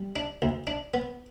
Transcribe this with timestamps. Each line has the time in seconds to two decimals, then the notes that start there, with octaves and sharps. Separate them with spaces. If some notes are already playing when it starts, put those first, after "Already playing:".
Already playing: G3
0.16 D4
0.42 D2
0.67 D4
0.94 B3